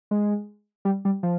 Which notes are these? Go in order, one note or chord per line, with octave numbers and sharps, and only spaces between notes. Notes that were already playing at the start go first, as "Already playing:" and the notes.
G#3
G3
G3
F3